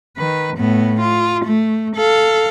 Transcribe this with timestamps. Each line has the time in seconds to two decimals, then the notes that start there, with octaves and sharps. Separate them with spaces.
0.17 D#3 B4
0.57 A2 B3
1.00 F4
1.45 A3
1.96 A4 F5